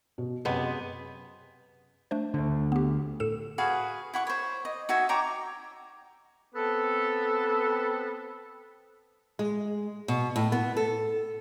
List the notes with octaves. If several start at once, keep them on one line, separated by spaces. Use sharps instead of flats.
B2
F#2 C3 G#3 B3
A3 D4 C5
D2 D3
B3 G4
A2 A4 E7
F#4 G#4 B4 F5
E4 F#5 C#6
C5 C#5
D#5
D#4 F#4 E5 G#5
C#5 G5 A#5 D6
B3 C4 A4
G#3
B2
A2
B3
A4